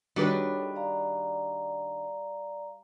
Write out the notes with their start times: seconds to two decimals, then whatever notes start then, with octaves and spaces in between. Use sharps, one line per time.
0.16 D#3 G3 D4 F#4 G#4 A4 B4 C#5
0.75 D5 F5 A#5